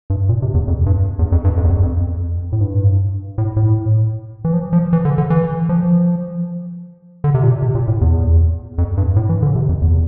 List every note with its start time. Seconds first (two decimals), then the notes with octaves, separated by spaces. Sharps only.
0.10 G2
0.29 A#2
0.42 C3
0.54 E2
0.68 F2
0.86 G2
1.19 E2
1.32 F2
1.44 G2
1.57 F2
1.64 E2
1.70 F2
1.83 F2
2.52 A2
2.60 G2
3.38 A2
3.56 A2
4.45 E3
4.53 F3
4.73 F3
4.93 E3
5.05 D3
5.18 D3
5.30 E3
5.69 F3
7.24 D3
7.34 C3
7.43 A#2
7.62 C3
7.75 A#2
7.88 A2
8.01 E2
8.78 F2
8.97 G2
9.16 A2
9.29 E3
9.42 D3
9.55 C3
9.69 F2
9.81 E2